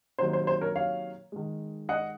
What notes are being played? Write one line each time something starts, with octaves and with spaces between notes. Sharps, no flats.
C3 D#3 F#3 A#3 C5
C5
C5
A#4 C#5
C#5 F5
D#3 G#3
D#5 F#5